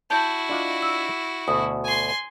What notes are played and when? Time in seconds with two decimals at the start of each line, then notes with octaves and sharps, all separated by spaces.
0.10 E4 F#4 A5 G6
0.49 D4 F4 D#5
0.82 E6
1.48 D2 B2 D#6
1.84 G#5 C6